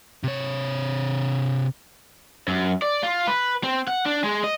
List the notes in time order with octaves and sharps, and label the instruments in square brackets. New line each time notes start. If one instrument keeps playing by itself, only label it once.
[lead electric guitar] C3 C#5
[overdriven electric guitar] F#2
D5
F4
B4
C4
F#5
D4
G#3
D#5